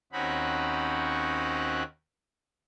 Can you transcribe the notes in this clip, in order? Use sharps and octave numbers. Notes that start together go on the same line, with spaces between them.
D#2 C4 C#4 D#4 F#4 B5